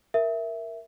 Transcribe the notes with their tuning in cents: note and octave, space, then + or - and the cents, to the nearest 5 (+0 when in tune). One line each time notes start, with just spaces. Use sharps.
A#4 +0 E5 +0